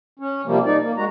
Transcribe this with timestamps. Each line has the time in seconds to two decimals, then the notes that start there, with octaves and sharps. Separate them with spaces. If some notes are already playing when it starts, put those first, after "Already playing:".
0.19 C#4
0.46 C3 F3 G3 A#3
0.65 D#4 D5
0.83 A#3
0.97 G#3 F#4 A#5